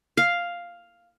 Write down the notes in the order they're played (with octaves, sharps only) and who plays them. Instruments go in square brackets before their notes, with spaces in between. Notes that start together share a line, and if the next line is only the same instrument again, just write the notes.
[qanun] F5